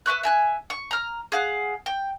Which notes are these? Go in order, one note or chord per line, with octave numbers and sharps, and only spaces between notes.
B4 E5 C#6 F#6
E5 G#5 F#6
C#6
A#5 F6
G#4 F5 F#5
G5